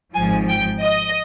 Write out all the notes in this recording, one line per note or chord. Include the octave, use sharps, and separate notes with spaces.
G#1 G#2 F3 G#5
G5
D#5